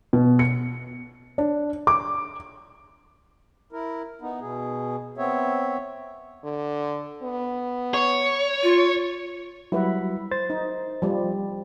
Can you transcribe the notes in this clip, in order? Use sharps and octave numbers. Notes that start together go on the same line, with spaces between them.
B2
C#7
D4
D6
E4 A#4
B3 D#4
B2 G#4
B3 C4 C#5 E5
D3
B3
C#5
F4
F#3 G3 E4 F#4 B4
C5 A6
D#4
F3 G3